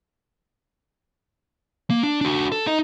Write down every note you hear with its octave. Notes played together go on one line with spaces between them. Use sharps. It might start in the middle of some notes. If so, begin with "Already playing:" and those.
A#3
D4
D4 F#4
A4
D#4 D#5